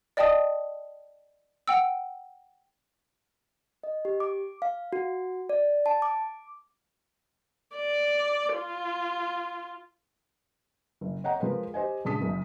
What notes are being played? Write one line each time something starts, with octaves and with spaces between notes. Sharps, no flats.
D5 D#5 G5 A5 D#6
F#5 G5 E6
D#5
G4
D6
F5
F#4
D5
A5
D6
D5
F4
F#1
C#5 D#5 F#5 G5 A#5
F3 G#3 A#4 B4
G4 C5 D#5 G#5
A#1 C#3 G#3 A5 D#6 B6
F#1 F#2